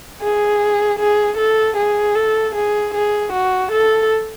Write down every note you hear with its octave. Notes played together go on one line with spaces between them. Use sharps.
G#4
G#4
A4
G#4
A4
G#4
G#4
F#4
A4